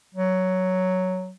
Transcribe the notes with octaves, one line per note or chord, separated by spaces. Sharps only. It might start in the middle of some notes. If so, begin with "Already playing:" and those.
F#3